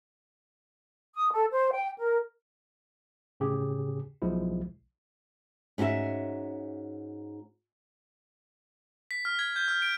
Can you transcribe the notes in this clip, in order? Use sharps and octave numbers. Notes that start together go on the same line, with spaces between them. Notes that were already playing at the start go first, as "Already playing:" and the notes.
D#6
A4
C5
G5
A#4
A2 C#3 G4 G#4
B1 B2 F3 G#3 E4
G#2 C#4 F#4 A#4 E5
B6
F6
G#6
G6
F6
D7